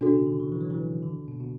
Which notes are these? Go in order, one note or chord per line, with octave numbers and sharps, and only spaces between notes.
B2 D4 F#4 A4
C#3
D3
E3
E3
F#3
E3
D3
B2
B2